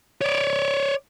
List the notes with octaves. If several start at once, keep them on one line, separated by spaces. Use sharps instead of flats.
C#5 D5